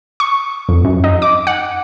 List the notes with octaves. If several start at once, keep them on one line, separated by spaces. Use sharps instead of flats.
C#6
F2
F#2
D#4
D6
F#5